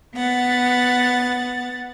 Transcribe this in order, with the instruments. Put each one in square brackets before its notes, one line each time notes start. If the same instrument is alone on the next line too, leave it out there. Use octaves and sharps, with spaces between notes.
[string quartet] B3 F#5 A6